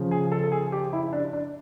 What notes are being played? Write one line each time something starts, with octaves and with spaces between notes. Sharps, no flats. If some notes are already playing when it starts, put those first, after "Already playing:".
Already playing: C#3 F3
G#4
A4
G#4
G4
E4
D4
D4